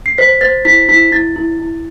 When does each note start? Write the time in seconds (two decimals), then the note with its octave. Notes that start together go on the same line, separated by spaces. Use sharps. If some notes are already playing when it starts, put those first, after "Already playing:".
0.06 C7
0.18 C5 B6
0.41 C5 A6
0.65 E4 B6
0.89 E4 B6
1.11 E4 A6
1.36 E4
1.60 E4